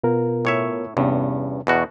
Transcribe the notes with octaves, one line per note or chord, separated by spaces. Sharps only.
B2 B3 F4 A#4
A2 C#5 E5
E2 G2 C3 B3 C#4
E2 B2 F#4